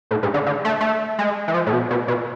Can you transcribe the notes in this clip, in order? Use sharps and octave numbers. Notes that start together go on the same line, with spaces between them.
A2
G#2
D3
D3
A3
A3
G#3
E3
F3
A2
B2
B2
B2